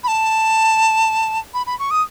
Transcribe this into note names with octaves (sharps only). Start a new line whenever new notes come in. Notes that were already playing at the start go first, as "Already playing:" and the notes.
B5
A5
B5
B5
C#6
D#6